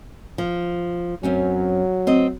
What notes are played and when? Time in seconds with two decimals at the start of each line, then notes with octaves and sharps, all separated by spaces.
0.38 F3
1.23 F#2 F#3 C4 C#4
2.07 C4 D#5